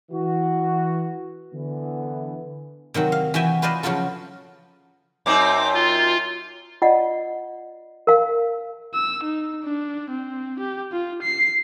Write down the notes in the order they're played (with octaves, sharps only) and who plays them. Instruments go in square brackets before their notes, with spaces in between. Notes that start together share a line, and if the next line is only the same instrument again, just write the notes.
[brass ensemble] E3 F#4
D3 E3 B3
[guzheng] C3 D#3 F#3 C4
F5
E3 F#4 E5 G5 G#5
F4 B4 C5 D5 D#5 F5
C#3 F3 F#3 F4 A4
[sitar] F#2 C4 D#4 [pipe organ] D6
[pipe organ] F4
[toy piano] F4 D5 D#5 F#5
A#4 F5
[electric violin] E6
D#4
D4
C4
G4
F4
C7